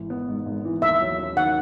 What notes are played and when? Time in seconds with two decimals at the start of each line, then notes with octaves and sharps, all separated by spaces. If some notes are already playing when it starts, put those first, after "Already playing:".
Already playing: G#1 E3
0.10 B3
0.29 G#2
0.46 G#1
0.65 E3
0.82 D#2 E5
1.00 F#3
1.19 C#4
1.37 D#3 F#5